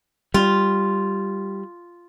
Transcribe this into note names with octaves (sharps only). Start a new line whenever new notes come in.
G3 F4